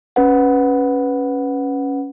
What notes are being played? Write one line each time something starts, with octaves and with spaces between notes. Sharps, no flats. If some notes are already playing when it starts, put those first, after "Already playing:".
C#4 B4 F#5